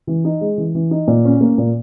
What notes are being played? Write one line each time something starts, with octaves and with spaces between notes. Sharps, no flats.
E3
D#4
G#3
E3
E3
D#4
A#2
C#4
A#3
A#2